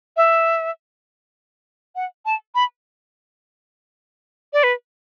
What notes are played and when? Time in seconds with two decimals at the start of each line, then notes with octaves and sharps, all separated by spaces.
0.17 E5
1.96 F#5
2.26 A5
2.55 B5
4.53 D5
4.63 B4